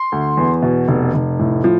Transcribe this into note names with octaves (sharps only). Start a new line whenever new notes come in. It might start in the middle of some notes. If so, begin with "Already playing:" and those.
Already playing: C6
D2
E2
B2
F1
F1
A2
F3